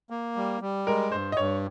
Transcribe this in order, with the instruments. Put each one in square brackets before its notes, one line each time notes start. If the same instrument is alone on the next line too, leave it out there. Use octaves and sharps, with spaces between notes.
[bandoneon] A#3
G3
G3
[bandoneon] G#3 [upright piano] A#4
[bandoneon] G2 [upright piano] C5
[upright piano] D#5
[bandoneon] G2 [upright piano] C#5